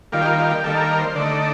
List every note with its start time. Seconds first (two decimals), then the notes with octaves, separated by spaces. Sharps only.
0.12 D#3 G3 A#3 F4
0.21 G4
0.25 F4
0.38 F4
0.51 G4
0.64 D#3 G3 A#3 A4
0.81 A#4
0.98 C5
1.15 D3 A3 D#4 D5